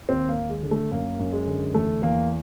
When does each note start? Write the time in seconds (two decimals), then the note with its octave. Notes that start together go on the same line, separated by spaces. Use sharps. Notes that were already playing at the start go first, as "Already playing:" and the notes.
0.09 D#2 C4
0.29 A#3
0.36 D#2
0.50 G#3
0.63 D3
0.71 A3
0.91 F#2 A#3
1.19 F#2
1.32 G#3
1.48 D3
1.74 E2 A3
2.02 E2 A#3